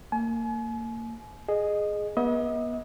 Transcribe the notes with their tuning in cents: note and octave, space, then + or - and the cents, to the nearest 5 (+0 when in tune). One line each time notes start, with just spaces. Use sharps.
A#3 -25 G#5 +40
G#4 +5 D#5 -15
B3 -35 D#5 +40